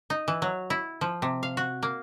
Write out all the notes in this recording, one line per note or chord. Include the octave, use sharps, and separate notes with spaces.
D#4
E3
F#3
E4
F3
C3
F5
F#4
A#3